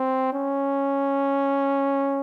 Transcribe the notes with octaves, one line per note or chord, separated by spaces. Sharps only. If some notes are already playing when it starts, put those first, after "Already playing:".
Already playing: C4
C#4